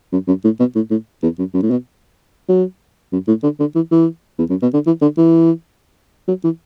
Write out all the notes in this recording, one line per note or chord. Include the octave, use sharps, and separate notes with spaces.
F#2
F#2
A2
B2
A2
A2
E2
F#2
F#2
A2
B2
F#3
F#2
A2
D3
D3
E3
E3
E2
F#2
B2
D3
E3
D3
E3
F#3
E3